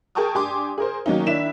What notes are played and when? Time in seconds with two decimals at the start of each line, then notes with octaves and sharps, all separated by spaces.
0.15 G#4 A#4 G5 A5 C#6 D#6
0.35 G2 G4 G#5 C6 D6
0.78 G#4 A#4 C5
1.06 D#3 F#3 A#3 C#4 D#4
1.26 D#3 D4 E4 B6 E7